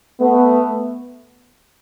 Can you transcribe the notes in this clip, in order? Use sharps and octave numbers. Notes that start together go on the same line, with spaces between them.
A3 B3